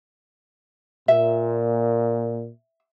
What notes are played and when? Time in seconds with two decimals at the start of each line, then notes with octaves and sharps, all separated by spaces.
1.08 A#2 E5